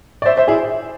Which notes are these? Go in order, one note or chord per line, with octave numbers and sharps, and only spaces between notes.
D5
C5 E5
C5 E5
E4 G#4